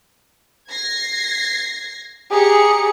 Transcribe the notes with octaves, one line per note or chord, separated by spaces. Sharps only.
G#6 A#6 C7
G4 G#4 A#5 C#7